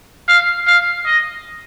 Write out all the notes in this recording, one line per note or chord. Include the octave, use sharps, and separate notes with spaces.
F5
F5
D#5